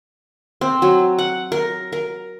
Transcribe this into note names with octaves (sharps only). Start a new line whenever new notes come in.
C4
F#3
F#5
A#4
A#4